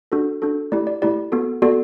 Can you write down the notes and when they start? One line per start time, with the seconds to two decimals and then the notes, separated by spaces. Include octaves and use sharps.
0.12 D4 F#4 A4
0.42 D4 F#4 A4
0.72 A3 E4 G4 D5
0.87 D5
1.02 A3 E4 G4 D5
1.32 B3 F#4 A4
1.62 B3 F#4 A4 D5